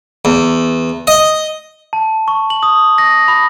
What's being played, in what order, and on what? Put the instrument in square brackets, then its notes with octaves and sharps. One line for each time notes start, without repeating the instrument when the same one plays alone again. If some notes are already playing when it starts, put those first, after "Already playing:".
[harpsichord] E2
D#5
[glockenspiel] A5
C#6
F#7
D#6
A#6
B5